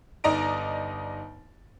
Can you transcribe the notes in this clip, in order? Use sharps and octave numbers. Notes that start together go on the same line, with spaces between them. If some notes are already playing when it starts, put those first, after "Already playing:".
G1 D#4 D5 D#5 A#5 D7